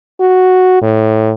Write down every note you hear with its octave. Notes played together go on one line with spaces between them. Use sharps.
F#4
A2